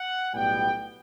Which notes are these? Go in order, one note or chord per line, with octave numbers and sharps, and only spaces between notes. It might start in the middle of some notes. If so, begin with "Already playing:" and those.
Already playing: F#5
B1 A2 G3 B3 G5